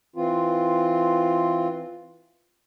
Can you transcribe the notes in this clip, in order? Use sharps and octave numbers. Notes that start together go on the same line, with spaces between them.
E3 C4 F4